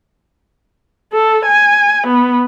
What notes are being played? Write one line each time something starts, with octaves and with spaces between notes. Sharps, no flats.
A4
G#5
B3